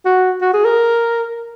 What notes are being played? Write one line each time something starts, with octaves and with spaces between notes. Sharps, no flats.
F#4
F#4
G#4
A#4